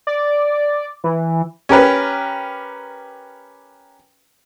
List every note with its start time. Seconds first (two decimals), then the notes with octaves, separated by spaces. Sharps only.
0.07 D5
1.04 E3
1.69 C#4 G4 A#4 B4